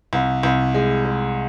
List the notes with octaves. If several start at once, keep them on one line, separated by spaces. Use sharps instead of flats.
C2
C2
G#3
G#3